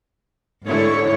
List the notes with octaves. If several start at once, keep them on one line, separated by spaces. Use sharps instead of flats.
G#2 D3 E4 C#5